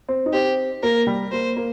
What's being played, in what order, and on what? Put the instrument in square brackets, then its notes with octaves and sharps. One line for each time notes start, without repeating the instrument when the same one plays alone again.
[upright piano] C4
D#4
[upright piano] C4 [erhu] G4
[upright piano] A#3 [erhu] A#4
[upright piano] G3
[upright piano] A#3 [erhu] C5
[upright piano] A#3